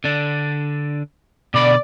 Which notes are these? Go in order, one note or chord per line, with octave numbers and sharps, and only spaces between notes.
D3 D4
B2 D3 D5 B5